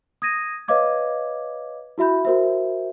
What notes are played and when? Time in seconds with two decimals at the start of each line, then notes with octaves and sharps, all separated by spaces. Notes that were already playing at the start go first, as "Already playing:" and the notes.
0.22 D#6 G#6 A#6 D#7
0.68 B4 C#5 D#5 F5 D6 G#6
1.98 E4 F#4 E5 B5 G6
2.25 F#4 A#4 C5 E5